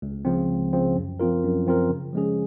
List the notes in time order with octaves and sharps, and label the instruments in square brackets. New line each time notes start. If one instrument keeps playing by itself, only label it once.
[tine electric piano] C#2
C#3 F3 C4
C#2
C#3 F3 C4
F#2
F3 C4 F4 A#4
F#2
F3 C4 F4 A#4
C#3
F3 G#3 C#4 G#4